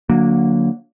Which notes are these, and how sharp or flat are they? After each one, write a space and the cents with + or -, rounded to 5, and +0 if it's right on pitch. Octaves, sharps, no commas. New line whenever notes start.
D3 +0 F#3 -25 A#3 +0